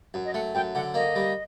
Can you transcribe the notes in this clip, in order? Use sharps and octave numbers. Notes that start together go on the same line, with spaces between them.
F#2
D#5
A3 F#5
F#2 G5
D3 F#5
A#3 D#5
G3